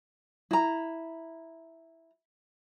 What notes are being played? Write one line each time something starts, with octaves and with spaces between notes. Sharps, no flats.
E4 A#5